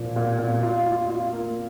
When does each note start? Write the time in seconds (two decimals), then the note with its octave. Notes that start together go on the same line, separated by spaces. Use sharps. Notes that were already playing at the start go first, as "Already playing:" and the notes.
Already playing: A#2 F3
0.16 A#2
0.39 A#2
0.63 F4
0.86 F4
1.10 F4
1.33 A#3